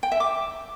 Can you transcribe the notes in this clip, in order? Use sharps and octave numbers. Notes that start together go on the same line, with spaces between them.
G5
E5
D6